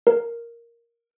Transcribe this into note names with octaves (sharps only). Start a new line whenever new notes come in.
A#4